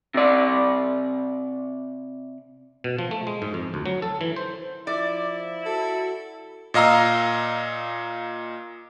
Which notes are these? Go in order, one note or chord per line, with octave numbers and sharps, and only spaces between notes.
C3 D5
B2
F3
A3
G#3
G#2
F2
D2
F#3
A4
E3
C5
F3 E4 D5
F#4 A4
A#2 D#5 F5 A#5 E6